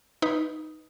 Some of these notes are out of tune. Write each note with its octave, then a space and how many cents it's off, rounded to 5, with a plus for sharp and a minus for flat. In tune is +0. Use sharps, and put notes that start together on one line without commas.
D#4 +0 B4 +0